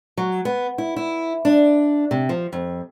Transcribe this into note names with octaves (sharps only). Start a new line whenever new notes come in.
F#3
B3
E4
E4
D4
C3
F3
F2